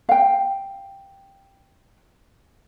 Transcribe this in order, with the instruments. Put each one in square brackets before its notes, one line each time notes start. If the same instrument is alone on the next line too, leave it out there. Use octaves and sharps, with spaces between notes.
[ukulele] F5 G5